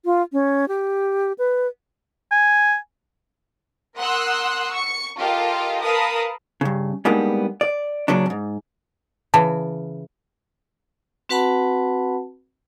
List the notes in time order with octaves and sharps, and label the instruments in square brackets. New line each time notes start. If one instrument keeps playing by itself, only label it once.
[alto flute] F4
C#4
G4
B4
[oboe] G#5
[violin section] A#4 F#5 C6 D#6 E6 F#6
C#6 C#7
F4 G4 A4 A#4 D#5 F5
A#4 B4 F5 A5 B5 D#6
[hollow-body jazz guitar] G2 C#3
G3 G#3 A#3 B3 D4 D#4
D5
A#2 C#3 F#3 C#4 D4
E2 G#2
[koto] C#3 E3 [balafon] A5
[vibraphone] C4 F#4 B4 F#5 A5 B5